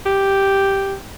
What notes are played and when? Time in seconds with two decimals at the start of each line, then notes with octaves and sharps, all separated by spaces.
0.06 G4